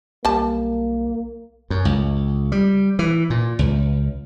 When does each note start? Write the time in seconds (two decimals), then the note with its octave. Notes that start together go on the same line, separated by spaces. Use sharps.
0.25 B1 G3 A#3 A5
1.70 F#2
1.85 C#2
2.52 G3
2.99 E3
3.30 A#2
3.59 C#2